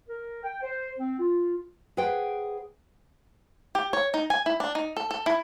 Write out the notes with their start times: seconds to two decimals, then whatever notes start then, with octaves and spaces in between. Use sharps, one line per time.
0.09 A#4
0.44 G5
0.62 C5
0.99 C4
1.19 F4
1.97 G#4 B4 C5 F#5 G5
3.75 G4
3.93 C#5
4.14 D#4
4.30 G#5
4.46 E4
4.60 D4
4.75 D#4
4.97 A4
5.11 A4
5.26 E4